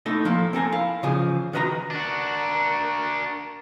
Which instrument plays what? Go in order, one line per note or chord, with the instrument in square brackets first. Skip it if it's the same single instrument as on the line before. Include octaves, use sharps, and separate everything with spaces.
[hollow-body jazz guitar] A3 D#4 E4 A4 D#5
F3 A#3 E4 A4
C4 A4 A#4 G#5
E4 F5
C#3 E3 F3 G#4
D#3 F#4 B4 D#5 G#5 A#5
[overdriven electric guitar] D4 F#4 [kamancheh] A#4